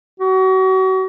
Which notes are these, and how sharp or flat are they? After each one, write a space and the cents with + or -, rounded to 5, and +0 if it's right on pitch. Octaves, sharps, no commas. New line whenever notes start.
F#4 +35